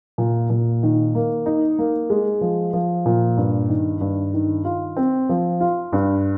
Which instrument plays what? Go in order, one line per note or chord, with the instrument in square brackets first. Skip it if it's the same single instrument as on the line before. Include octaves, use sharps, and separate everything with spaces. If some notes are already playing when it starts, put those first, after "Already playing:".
[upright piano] A#2
A#2
D#3
A#3
D#4
A#3
G#3
F3
F3
A#2
G2
D#3
G2
D#3
F4
C4
F3
F4
G2